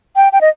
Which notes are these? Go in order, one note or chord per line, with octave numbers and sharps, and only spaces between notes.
G5
G5
D#5